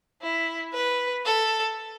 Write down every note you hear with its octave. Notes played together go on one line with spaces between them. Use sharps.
E4
B4
A4